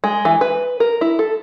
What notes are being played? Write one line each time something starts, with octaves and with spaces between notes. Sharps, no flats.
G#3
E3
B4
A#4
E4
A4